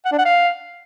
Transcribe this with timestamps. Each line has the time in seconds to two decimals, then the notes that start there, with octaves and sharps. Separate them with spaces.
0.05 F#5
0.12 D4
0.18 F#5
0.25 F5